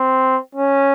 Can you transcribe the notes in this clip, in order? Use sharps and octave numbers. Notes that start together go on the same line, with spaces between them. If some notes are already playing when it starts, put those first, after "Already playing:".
Already playing: C4
C#4